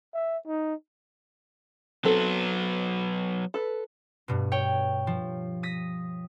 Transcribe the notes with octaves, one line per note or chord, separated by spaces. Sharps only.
E5
D#4
F#3 B3 C4 A4
A4 B4
G2 B2
C#5 G5
F3
D#6 A#6 B6